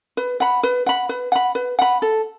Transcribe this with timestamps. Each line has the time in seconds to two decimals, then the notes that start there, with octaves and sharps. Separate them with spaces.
0.17 B4
0.40 F#5 B5
0.63 B4
0.86 F#5 B5
1.09 B4
1.32 F#5 B5
1.55 B4
1.79 F#5 B5
2.02 A4